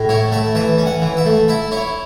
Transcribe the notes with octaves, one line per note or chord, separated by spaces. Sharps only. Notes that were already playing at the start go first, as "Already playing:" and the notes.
Already playing: A2
E4 C#5
A3 E5
E3 E5
C#4
F#5
E3
E5
A3
E4 E5
E4 C#5